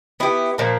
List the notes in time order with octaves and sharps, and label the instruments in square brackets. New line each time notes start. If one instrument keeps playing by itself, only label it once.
[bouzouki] B3 E4 G4
A#2 F3 A#3